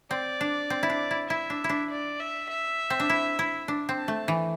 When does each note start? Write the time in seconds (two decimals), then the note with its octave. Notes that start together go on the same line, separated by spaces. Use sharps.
0.10 C4 D5
0.41 D4
0.70 C4
0.83 E4
0.90 D4
1.11 E4
1.29 E4 E5
1.50 D4
1.64 E4
1.69 D4
1.90 D5
2.20 E5
2.49 E5
2.90 C4
3.00 D4
3.09 E4
3.39 E4
3.68 D4
3.89 C4
3.98 A5
4.08 A3
4.28 E3